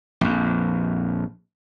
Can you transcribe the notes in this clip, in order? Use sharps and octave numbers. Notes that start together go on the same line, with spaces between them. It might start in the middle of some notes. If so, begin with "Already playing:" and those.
A#1 F2